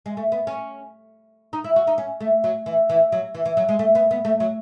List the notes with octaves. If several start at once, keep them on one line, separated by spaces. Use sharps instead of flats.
G#3
A3
B3
C#4
D#4
E4
F#4
D#4
C#4
A3
F#3
E3
E3
F#3
E3
E3
F#3
G#3
A3
B3
B3
A3
F#3